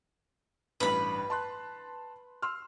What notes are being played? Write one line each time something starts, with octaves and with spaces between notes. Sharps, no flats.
A1 G2 B4 B5
A5 C6 F#6
C6 E6 F6